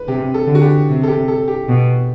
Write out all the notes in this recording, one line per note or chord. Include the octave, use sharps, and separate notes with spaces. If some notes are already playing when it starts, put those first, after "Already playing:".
Already playing: B4
C3 G4
A4
D3
F#4
G4
C3
A4
G4
A4
G4
B2